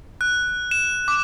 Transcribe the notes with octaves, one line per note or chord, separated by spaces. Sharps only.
F#6
E7
D6